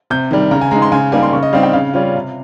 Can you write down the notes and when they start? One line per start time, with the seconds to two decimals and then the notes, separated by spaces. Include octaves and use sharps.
0.10 C3 G6
0.31 D#3 G3
0.51 C#3 A#5
0.61 G#5
0.71 G#3 D#4 A#5
0.82 C6
0.92 C#3 G#5
1.12 G3 A#3 D#4 G#5
1.23 C6
1.33 C#3 C#6
1.43 D#5
1.53 G3 C4 D#4 F5
1.63 G5
1.73 C#3 F5
1.94 G3 C#4 F4
2.15 C3